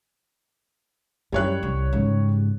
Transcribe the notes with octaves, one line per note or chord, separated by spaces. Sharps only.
F#2 G3 C#5 F#6
C2
G#2 C#3